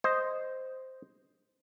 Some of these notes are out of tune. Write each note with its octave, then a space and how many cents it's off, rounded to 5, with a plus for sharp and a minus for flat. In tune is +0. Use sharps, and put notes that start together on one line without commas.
C5 -5 D#5 +0